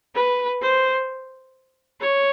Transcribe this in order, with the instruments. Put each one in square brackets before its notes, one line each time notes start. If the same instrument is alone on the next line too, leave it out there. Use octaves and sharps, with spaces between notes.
[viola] B4
C5
C#5